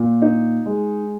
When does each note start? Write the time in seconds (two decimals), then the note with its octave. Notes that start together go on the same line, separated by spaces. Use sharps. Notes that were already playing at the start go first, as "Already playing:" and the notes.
Already playing: A#2
0.22 D#4
0.66 G#3